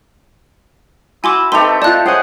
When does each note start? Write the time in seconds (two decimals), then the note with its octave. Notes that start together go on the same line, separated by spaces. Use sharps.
1.24 E4 F#4 G#5 C6 D6
1.52 A3 C4 D#4 G4 A4 B4 C6 F7
1.82 F4 D5 D#5 A5 F#6
2.06 C#4 G#4 C5 D#5 F#5 G5